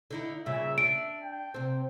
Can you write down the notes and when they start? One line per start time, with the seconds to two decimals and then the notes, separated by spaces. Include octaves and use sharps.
0.11 D3 D#4 E4
0.46 G2 A#2 C#3 E5
0.78 D4 E5 D7
1.23 G5
1.54 C3 C4